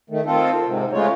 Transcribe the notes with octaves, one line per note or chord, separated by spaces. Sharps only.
D#3 A3
D#3 C4 F4 A4
G#2 C3
C#3 G#3 A3 F4 C#5